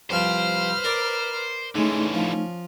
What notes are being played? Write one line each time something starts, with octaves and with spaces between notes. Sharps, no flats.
C2 F3 B4 C5 G5 F6
A#4 D5
D3 E3 G#3 A3 C#4 D#4
F3